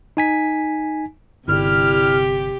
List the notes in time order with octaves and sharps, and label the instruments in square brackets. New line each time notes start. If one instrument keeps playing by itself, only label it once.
[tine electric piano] D#4 G#5 B6
[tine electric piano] G1 [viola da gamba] C3 G4 [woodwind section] G3 E4 F6